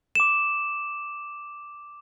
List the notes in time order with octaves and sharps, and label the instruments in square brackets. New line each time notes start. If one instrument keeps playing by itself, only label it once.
[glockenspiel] D6 E7